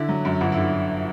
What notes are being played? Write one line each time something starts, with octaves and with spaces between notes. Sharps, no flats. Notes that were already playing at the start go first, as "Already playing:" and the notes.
Already playing: D3 E4
F#3
F#2
G1 F#4
E4
D3
E4